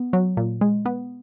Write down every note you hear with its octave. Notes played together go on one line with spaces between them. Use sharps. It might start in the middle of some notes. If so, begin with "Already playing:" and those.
Already playing: B3
F#3
A#2
G#3
B3